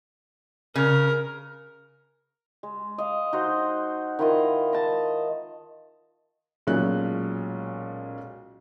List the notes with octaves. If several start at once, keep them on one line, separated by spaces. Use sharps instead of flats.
C#3 A#4
G#3
D#5 F5
D#4 F#4 C5
D#3 E4 F4 D#5
D#5 A5
B1 A#2 G#3 C#4 F#6